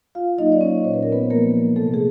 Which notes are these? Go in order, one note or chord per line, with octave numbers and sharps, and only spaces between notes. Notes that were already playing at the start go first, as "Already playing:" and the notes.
F4 F5
F#3 A#3 D#4 D#5
D5
C#4 C#5
A#2 C5
B4
A#4
B3 B4
F3 G#3 A#3 A#4
C3 A3 A4
G#4